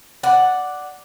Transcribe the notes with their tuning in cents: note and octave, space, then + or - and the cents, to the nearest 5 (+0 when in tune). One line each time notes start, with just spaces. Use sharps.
D5 +0 F#5 +0